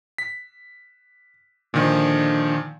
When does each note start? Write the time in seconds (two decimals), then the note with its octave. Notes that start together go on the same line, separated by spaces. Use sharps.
0.18 B6
1.74 A#2 D3 D#3 F3